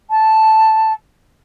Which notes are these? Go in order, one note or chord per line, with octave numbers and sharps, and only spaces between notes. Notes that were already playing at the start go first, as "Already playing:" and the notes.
A5